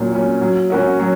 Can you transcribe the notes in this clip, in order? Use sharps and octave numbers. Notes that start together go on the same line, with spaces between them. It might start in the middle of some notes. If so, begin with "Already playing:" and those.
Already playing: A#2 F#3 C#4
F#3 C#4
F#3
C#4 F#4 A#4
F#3